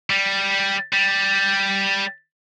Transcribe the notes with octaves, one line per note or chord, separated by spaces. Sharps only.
G3
G3